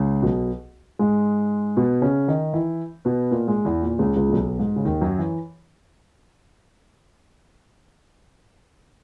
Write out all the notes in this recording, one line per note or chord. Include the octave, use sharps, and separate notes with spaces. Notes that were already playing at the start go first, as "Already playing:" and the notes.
Already playing: C#2 C#3
B1 B2
G#2 G#3
B2 B3
C#3 C#4
D#3 D#4
E3 E4
B2 B3
A#2 A#3
G#2 G#3
E2 E3
A#2
C#2 C#3
C#2 C#3
A#2
B1 B2
G#2
C#3
D#2 D#3
F#2 F#3
E3